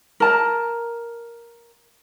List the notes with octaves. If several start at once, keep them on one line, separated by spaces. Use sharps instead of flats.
A#4 A5 A#5